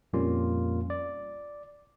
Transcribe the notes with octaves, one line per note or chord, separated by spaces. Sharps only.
F2 A#2 G3 A#3 C#4 F4
D5